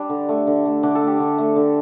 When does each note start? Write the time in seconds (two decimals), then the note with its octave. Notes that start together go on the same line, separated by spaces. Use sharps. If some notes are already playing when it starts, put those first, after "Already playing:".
Already playing: G3 D4
0.09 D3
0.29 A3
0.47 D3
0.65 A3
0.83 D3 D4
0.95 A4
1.01 A3
1.07 G4
1.19 D3
1.38 A3
1.56 D3